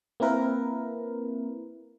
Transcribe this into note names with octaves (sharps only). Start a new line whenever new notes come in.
A#3 C4 E4 A#4 B4